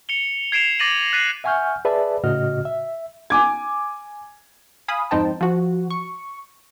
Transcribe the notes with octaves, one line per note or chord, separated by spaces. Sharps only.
C#7 F7 G7
G#6 C7 D7 E7 F7
D6 A6 A#6 D#7 F#7
F#6 A6 B6 C7 D#7 F#7
E5 F#5 G#5 C#6 F6 G6
G#4 B4 D5 E5 A5
A2 C#3 F#4 D#5 F6
E5
G#5 D6 G#6
F5 G#5 B5 D#6
F2 G#2 D#4 C5 G5 A5
F3 F#4
C#6